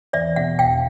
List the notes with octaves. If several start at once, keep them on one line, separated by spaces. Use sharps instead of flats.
E2 D5 E5
B2 E5 F#5
E1 F5 G5